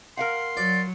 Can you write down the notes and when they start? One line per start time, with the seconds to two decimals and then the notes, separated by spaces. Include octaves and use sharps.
0.17 A#4 F5 F#5 C6
0.57 F#3 D5